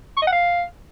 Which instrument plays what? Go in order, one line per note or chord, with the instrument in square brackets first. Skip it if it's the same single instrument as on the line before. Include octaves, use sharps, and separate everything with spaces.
[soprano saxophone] C#6
D#5
F#5
F5